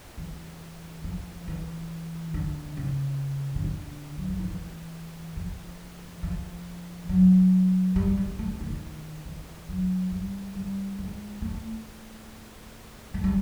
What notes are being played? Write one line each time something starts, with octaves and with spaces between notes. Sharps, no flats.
E3
F3
E3
D3
C#3
C#3
D3
F#3
F3
E3
E3
F3
F3
F#3
G3
G#3
A3
D3
D#3
E3
F#3
G3
G3
G#3
A3
G#3
G3